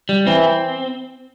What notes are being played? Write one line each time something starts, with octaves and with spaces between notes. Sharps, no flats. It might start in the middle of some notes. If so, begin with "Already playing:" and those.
G3
E3 C4